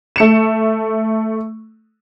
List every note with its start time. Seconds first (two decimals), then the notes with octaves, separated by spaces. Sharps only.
0.16 A3 C#7 E7